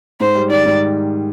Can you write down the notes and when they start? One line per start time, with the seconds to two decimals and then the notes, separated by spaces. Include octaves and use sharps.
0.20 G#2 C5
0.35 G3
0.50 D#3 D5
0.65 G#2